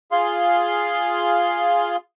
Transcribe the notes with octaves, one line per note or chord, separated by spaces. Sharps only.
F4 G#4 F5 C6